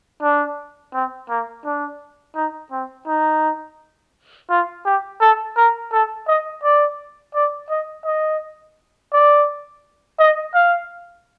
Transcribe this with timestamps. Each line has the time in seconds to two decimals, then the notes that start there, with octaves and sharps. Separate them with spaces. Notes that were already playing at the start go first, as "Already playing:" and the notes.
0.22 D4
0.94 C4
1.29 A#3
1.65 D4
2.36 D#4
2.72 C4
3.07 D#4
4.50 F4
4.85 G4
5.21 A4
5.57 A#4
5.92 A4
6.28 D#5
6.63 D5
7.34 D5
7.70 D#5
8.06 D#5
9.13 D5
10.19 D#5
10.54 F5